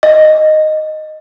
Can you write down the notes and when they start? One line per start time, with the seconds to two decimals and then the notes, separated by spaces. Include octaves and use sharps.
0.03 D#5